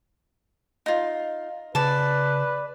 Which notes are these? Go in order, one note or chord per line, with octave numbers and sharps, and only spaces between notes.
D#4 F4
C#3 B4 D5 A5